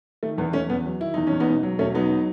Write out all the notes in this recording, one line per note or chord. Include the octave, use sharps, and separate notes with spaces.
D#3 A3
E2 B3
E2 A3 C#4
E2 B3
F#3
D#3 E4
E2 D#4
C#4
E2
B3 D#4
E1
F#3
E1 A3 C#4
F#3 B3 D#4